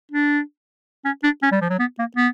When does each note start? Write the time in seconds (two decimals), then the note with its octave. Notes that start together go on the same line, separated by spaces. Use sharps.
0.12 D4
1.05 C#4
1.24 D4
1.43 C#4
1.52 G3
1.61 F3
1.70 F#3
1.79 B3
1.99 A#3
2.17 B3